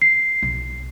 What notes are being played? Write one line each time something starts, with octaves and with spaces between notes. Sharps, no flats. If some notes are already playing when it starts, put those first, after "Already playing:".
C7
B1